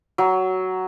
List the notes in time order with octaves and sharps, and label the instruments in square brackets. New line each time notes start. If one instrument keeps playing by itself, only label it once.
[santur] F#3